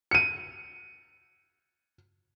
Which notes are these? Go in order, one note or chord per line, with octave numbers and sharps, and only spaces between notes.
C#7 D#7